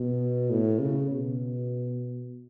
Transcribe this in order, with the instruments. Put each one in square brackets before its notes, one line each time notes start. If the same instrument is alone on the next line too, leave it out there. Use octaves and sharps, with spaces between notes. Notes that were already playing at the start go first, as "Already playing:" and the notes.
Already playing: [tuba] B2
A2
C#3
B2